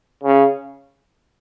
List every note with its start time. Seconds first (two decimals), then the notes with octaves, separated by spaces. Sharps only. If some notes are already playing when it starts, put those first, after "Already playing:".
0.23 C#3